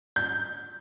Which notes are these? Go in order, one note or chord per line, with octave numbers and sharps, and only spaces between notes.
G6